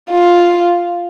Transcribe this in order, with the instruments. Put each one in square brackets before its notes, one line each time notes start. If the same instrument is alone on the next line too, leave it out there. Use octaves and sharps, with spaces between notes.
[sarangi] F4